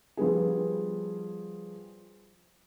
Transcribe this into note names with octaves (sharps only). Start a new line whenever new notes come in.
F3 G3 B3 G#4